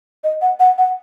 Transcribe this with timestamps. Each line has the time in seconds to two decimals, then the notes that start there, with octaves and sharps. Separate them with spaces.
0.24 D#5
0.42 F#5
0.60 F#5
0.78 F#5